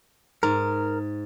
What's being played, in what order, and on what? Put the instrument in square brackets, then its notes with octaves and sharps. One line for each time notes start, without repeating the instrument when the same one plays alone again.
[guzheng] G#2 [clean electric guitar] A#4